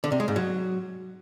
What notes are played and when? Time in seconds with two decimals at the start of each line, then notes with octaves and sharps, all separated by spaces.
0.04 D3
0.12 C3
0.20 G#3
0.28 G#2
0.36 F#3